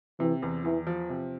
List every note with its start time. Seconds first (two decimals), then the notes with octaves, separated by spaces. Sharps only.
0.19 C3 E3
0.42 E2
0.64 E2 E3
0.87 F3
1.10 C3